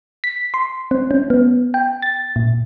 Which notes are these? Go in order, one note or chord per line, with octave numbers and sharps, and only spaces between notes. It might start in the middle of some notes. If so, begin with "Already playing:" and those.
B6
C6
C4
C#4
B3
G5
A6
A#2